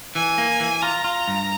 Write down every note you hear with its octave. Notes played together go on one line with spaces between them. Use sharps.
E3 G#5
A#3
E3
F4 A#5
F4
G2